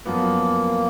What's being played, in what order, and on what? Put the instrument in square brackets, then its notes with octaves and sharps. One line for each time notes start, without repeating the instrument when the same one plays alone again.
[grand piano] F#2 F3 B3 [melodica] A#3